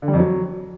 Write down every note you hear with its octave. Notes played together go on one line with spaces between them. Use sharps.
D3
G3
F2
F#3